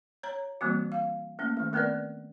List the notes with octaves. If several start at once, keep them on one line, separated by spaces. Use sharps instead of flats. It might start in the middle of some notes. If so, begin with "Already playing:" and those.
C#5 A#5
E3 G3 A#3 C4 F#4
F5
A3 A#3 C#4
D#3 A3
A3 B3 C4 A#4 B4 D5